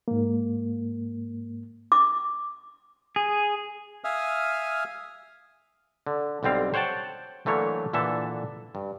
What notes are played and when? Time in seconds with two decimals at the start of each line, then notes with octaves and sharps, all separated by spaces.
0.08 G#2 A#3
1.92 D6
3.16 G#4
4.04 E5 F5 G#5 D#6 F6
6.07 D3
6.43 B1 D3 G3 C4 F5
6.74 C5 C#5 F#5 G5 A5
7.46 D3 E3 F#3 A3 A#3 C#5
7.93 A#2 D3 E3 A4 E5 A5
8.75 G2